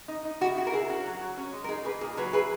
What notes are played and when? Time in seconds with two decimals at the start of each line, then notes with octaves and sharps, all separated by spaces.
0.08 D#4
0.25 D#4
0.41 E4 F#4
0.57 E4 F#4
0.67 A#4
0.73 E4 G#4
0.89 C#4 F#4
1.05 F#3
1.21 F#3
1.37 C#4
1.53 G#3
1.64 A#4
1.69 D#4 G#4
1.85 A#3 G#4 B4
2.01 A#2 G#4
2.17 F#3 G#4 B4
2.33 E4 G#4 B4